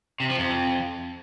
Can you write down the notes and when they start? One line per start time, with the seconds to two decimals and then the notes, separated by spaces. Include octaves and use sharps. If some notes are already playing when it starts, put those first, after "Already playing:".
0.20 C3
0.29 F3
0.39 F2